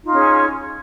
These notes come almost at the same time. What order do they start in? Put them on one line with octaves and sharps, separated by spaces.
D#4 F4 C#4 G#4